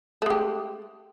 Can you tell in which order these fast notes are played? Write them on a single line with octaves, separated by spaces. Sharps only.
A3 G#3 G4